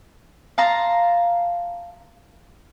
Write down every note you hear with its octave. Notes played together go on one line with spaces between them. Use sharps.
F5 A5 A#5 C6